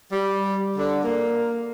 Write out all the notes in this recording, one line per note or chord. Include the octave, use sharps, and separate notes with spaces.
G3
D3
A#3